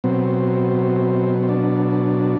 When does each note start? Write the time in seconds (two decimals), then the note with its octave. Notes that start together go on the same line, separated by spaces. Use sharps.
0.04 B2 F#3 C4
1.43 C4
1.49 D4